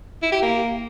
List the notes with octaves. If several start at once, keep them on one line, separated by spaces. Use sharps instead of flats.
E4
G4
A#3